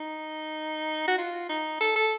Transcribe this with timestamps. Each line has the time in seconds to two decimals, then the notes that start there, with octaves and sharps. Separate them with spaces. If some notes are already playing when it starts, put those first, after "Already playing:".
Already playing: D#4
1.07 F#4
1.18 F4
1.49 D#4
1.80 A4
1.96 A4